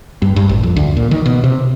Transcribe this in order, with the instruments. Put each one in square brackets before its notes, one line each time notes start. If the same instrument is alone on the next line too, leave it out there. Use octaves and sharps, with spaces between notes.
[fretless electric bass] G2
G2
A1
F2
D2
A#2
D#3
B2
C3